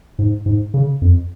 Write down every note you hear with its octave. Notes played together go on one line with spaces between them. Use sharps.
G#2
G#2
C#3
F2